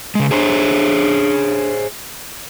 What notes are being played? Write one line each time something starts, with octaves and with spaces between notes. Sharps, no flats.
C#3 G#3
D4 G#4 C5 C#5